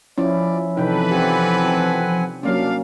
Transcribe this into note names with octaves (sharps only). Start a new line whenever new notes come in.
F3 C#4 E4 D5
C3 E3 D#4 A4 B4 G5
C4 G4 F#5 G#5
C2 F#3 A#3 C#4 D4 D5 F5